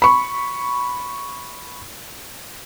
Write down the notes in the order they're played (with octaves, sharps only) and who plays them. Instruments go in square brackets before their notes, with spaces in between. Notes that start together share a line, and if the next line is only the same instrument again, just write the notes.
[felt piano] B5 C#6